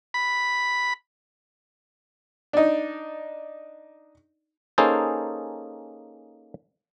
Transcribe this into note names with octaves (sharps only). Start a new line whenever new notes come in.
B5
D4 D#4
A#3 C#4 D#4 G#4 A4 C5